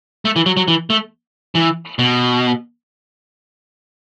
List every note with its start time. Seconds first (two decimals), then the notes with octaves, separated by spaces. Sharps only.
0.25 A3
0.36 E3
0.46 F#3
0.57 F#3
0.68 E3
0.90 A3
1.55 E3
1.99 B2